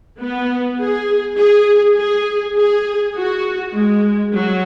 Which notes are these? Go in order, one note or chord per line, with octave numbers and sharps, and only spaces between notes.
B3
G#4
G#4
G#4
G#4
F#4
G#3
F#3